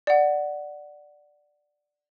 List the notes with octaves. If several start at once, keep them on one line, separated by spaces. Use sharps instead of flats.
D5 F#5